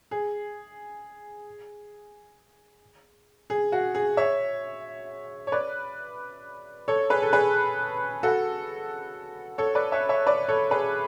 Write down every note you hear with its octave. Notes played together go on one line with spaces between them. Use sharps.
G#4
G#4
F#4
G#4
C#5 E5
C#5
B4 D5
A4 C#5
G#4 B4
A4
G#4 B4
F#4 A4
A4 C#5
B4 D5
C#5 E5
C#5 E5
B4 D5
A4 C#5
G#4 B4